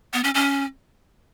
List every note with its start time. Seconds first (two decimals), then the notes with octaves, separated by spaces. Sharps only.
0.13 B3
0.24 C#4
0.35 C#4